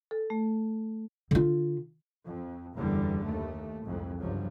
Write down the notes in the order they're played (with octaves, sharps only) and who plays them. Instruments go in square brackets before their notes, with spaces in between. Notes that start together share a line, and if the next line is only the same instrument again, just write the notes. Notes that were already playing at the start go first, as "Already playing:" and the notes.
[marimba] A4
A3
[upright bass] D3 F4
[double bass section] F2
F#1 E2 D3 G3
D#2 A3
C2 F2 G#2
G1 C#2 G2 F3 F#3